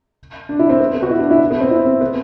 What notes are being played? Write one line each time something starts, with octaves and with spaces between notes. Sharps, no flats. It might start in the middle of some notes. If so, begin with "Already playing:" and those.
D4
E4
C4
B3
B3
F#4
E4
D4
E4
B3
C4
E4
C4
B3